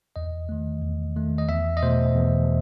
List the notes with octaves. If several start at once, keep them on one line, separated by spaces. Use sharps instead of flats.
E2 D#5
D#3 A3
E2
D#3 A3
D#5
E2 E5
D#5
B2 A3 C5
E2